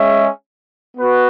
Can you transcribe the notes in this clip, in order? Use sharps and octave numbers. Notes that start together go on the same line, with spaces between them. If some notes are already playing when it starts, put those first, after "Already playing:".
Already playing: G#3 C#4 G#4 E5
B3 F#4 B4